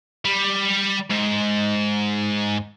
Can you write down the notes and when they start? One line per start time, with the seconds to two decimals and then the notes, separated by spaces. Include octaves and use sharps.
0.25 G3
1.10 G#2